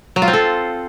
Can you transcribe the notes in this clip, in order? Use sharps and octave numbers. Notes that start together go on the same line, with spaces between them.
F#3
F4
C4
A4